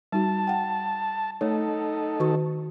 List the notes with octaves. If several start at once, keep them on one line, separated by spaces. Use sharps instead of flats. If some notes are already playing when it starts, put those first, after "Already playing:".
G3 D#4 F#4 A5
F#5 G5
A3 D#4 A4 C#5
D#3 F#4 C#6